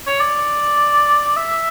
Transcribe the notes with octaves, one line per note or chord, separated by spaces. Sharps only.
C#5
D5
E5